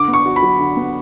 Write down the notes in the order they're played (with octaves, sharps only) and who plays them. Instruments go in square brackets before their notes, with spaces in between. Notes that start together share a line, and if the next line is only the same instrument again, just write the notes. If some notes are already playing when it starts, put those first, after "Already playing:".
Already playing: [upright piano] D3 [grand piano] D6
[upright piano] B3
[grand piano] C#6
[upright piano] F#4
[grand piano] B5
[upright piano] F#3
D3
B3